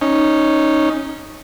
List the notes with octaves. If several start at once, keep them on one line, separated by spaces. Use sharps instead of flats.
C#4 D#4